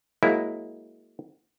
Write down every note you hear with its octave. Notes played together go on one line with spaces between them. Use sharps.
F#3 G#3 A#3 E4